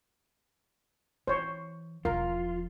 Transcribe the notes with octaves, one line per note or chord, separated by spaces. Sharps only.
E3 C5 C#5
E1 F3 F4 A#4